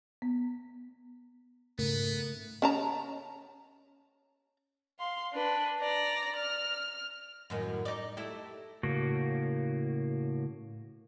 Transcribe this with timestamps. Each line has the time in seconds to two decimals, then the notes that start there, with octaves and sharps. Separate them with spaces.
0.22 B3
1.79 G#2 C#3 A3 B3 A#4
2.62 C#4 A5 A#5
4.99 F5 C6
5.33 D4 B4
5.80 D5 A#5
6.37 F6
7.50 F#2 A2 D#3
7.85 D#4 D5
8.17 A3 E4 G4
8.83 A2 C#3 A#3 F#4